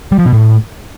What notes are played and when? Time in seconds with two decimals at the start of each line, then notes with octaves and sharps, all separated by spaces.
0.12 G3
0.19 F3
0.26 B2
0.33 A2